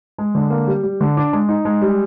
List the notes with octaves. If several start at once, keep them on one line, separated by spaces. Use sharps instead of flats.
G#3
D3
A#3
G3
G3
D3
D4
G#3
D#4
G#3
G3